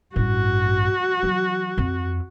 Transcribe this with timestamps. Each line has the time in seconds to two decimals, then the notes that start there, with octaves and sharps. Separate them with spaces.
0.16 A1 G2 F#4
1.23 E3 F#3
1.78 F2